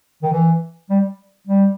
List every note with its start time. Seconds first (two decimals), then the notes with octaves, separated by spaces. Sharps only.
0.23 D#3
0.32 E3
0.90 G3
1.47 G3